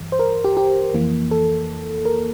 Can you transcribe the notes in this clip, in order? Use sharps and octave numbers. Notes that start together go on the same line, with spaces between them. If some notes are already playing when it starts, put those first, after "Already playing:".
Already playing: G2 E3
C5
A#4
G4
G4
F2 E3 A#3
A4
A#4